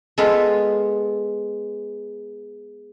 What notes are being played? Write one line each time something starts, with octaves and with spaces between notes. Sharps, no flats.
G#3 B3 F4 A4 B4 F5